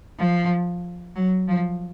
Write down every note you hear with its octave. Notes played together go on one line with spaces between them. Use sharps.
F3
F#3
F3